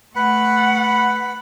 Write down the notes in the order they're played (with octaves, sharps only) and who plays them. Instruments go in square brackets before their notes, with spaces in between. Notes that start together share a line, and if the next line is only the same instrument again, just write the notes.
[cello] A3 F#5 [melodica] B4 B5